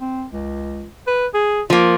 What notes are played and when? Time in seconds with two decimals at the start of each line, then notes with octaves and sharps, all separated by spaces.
0.01 C4
0.32 C#2
1.07 B4
1.34 G#4
1.70 F3 A#3 F4